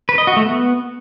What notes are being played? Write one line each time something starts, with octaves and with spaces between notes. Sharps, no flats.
B4
D#5
F#4
A3
B3